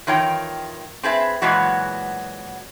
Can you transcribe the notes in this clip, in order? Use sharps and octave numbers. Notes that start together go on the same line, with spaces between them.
D#3 E3 F4 C#5 G5
C4 G#4 B4 E5
A#2 E3 F#3 G#3 B3 F#4